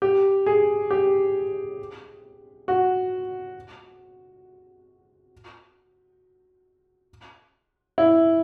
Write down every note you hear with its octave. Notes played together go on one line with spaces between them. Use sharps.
G4
G#4
G4
F#4
E4